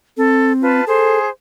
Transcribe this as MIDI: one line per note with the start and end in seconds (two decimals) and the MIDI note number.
0.17 0.81 60
0.17 0.53 69
0.62 0.84 65
0.62 0.84 71
0.62 0.84 81
0.87 1.29 68
0.87 1.18 69
0.87 1.29 72